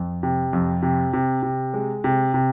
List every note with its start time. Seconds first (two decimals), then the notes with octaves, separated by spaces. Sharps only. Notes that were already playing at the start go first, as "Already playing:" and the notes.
Already playing: F2
0.23 C3
0.53 F2
0.82 C3
1.13 C3
1.43 C3
1.74 G#3
2.04 C3
2.34 C3